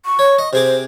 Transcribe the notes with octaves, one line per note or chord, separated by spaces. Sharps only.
C#6
C#5
D#5
C3 G#4 C5 D6